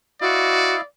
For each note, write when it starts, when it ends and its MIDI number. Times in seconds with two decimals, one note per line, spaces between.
0.21 0.81 64
0.21 0.76 66
0.21 0.85 74
0.21 0.81 75
0.21 0.81 77